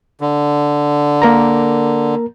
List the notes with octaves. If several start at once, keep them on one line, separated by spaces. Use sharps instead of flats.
D3
A#3 A#4 A#5